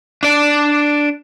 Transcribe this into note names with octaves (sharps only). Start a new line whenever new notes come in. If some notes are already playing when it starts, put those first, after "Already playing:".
D4 D5